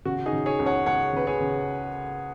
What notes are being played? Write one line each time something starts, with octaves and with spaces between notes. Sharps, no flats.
C#3 F#4
D#4 G#4
C#3
G#4 C#5
C#2
C#5 F#5
C#2 C#5 F#5
C#3 B4
G#4 C#5
C#3